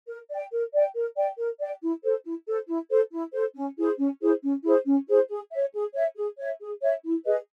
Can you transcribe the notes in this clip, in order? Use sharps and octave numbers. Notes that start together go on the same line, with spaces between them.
A#4
D5 G5
A#4
D5 G5
A#4
D5 G5
A#4
D5 G5
E4
A4 C5
E4
A4 C5
E4
A4 C5
E4
A4 C5
C#4
E4 G#4 C5
C#4
E4 G#4 C5
C#4
E4 G#4 C5
C#4
E4 G#4 C5
G#4
C#5 E5
G#4
C#5 E5
G#4
C#5 E5
G#4
C#5 E5
E4
G#4 B4 D#5